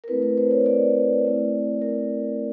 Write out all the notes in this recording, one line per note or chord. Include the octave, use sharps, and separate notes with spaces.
A#4
A3 C4 E4 B4
B4
C5
C#5
D5
A3 C4 E4
A#4